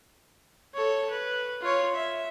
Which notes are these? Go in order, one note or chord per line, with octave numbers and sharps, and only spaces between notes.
A4 C#5
B4
F4 C#5
E5